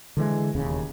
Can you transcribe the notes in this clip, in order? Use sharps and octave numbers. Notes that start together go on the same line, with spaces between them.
D3 E3 G#3
E1 D#2 C#3